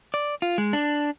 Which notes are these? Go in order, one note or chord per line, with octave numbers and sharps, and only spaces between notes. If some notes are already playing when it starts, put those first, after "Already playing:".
D5
F4
G#3
D4